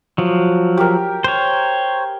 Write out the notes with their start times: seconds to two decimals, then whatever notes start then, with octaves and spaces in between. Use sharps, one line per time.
0.18 F3 F#3
0.77 G4 A#4
1.24 C5 C#5